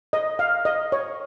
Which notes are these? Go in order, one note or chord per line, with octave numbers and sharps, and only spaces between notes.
D#5
F5
D#5
C#5